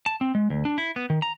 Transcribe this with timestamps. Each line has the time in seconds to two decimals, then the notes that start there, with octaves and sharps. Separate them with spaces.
0.06 A5
0.21 C4
0.35 G#3
0.50 D2
0.65 D4
0.78 E4
0.96 B3
1.10 D#3
1.22 A#5